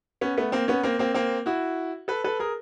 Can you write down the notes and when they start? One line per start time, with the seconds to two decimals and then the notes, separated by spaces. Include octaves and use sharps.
0.21 B3 C#4
0.37 A3 B3
0.52 A#3 C4
0.68 B3 C#4
0.83 A#3 C4
0.99 A#3 C4
1.14 A#3 C4
1.46 E4 F#4
2.08 A4 B4
2.24 A4 B4
2.39 G#4 A#4